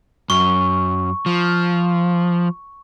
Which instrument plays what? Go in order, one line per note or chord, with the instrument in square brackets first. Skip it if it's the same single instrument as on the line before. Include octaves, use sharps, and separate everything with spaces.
[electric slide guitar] F#2 [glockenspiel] C#6
[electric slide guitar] F3